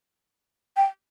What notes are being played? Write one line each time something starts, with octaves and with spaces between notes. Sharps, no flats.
G5